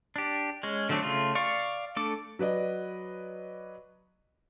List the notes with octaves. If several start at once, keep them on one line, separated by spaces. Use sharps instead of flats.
D4 G4
G#3 C#4
D3 F#3 A3 C4 D4
C#3 A3 F4
D5 F5 C#6
A3 D4 A4 D6
F#3 B4 D5 D#5